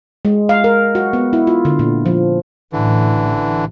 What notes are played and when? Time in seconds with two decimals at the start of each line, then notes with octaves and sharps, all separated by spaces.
0.25 G#3
0.49 F5
0.64 A#4
0.95 F#4
1.13 B3
1.33 E4
1.47 F4
1.65 D3
1.79 A#2
2.06 F3
2.73 A1 D3 E3